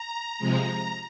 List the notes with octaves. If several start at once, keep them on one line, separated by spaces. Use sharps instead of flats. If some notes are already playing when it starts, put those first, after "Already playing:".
Already playing: A#5
C3 F3 G#3